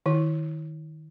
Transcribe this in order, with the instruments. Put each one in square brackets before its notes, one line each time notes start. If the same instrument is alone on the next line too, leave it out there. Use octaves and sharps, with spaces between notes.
[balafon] D#3 E4